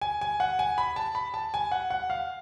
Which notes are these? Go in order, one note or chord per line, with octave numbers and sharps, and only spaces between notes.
G#5
G#5
F#5
G#5
B5
A5
B5
A5
G#5
F#5
F#5
F5